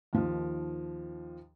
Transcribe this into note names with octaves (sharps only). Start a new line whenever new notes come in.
D#2 D#3 F3